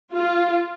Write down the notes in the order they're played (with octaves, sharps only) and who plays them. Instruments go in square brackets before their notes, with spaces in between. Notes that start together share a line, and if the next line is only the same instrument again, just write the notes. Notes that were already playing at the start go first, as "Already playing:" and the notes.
[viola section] F4